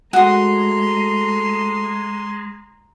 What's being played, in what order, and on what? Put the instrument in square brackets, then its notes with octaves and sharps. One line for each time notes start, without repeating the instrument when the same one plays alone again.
[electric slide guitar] G#3 [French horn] A3 [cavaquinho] F#4 D#6 [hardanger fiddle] A#5 C6